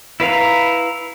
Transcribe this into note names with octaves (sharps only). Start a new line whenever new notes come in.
E4 B4 F5 A#5